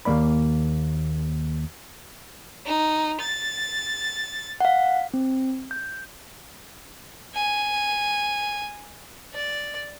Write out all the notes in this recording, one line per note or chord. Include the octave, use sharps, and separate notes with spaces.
D#2 G#2 A#3 D5 B5
D#4
A6
F5 F#5
C4
G6
G#5
D5